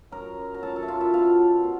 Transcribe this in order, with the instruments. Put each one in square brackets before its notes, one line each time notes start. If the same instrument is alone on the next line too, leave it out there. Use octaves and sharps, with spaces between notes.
[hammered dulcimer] F#2 A#4 A#5
F#2
A#5
F#2 A4 A5
A4 A5
E5
F#2 F4 F5
E4 E5
B2 F4 F5
B2
B2